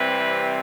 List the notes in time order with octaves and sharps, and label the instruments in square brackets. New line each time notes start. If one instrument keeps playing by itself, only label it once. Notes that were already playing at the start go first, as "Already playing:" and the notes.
Already playing: [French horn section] C3 E3 G3 C4 B4